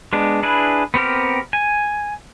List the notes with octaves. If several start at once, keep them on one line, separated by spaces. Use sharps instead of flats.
G#3 B3 D4
D4 E4 G#4 B4
B3 C4 G4 A#4
G#5